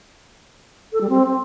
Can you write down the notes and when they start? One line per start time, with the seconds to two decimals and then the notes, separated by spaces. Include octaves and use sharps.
0.92 A4
1.00 G3
1.09 C4